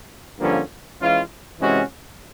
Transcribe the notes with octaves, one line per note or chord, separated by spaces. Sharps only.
G2 D3 F3 A#3 C#4
E3 G#3 C#4 F4
C3 E3 G#3 C#4 F#4